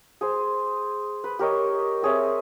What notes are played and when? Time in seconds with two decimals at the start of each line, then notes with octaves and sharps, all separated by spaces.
0.21 G#4 C5
1.24 B4
1.39 G4 A#4 C#5 D#5
2.02 C4 G#4 C#5 E5